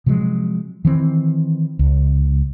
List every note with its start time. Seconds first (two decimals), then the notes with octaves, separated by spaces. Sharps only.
0.06 C3 F3 F#3 G#3
0.85 D#3 E3 C4
1.79 C#2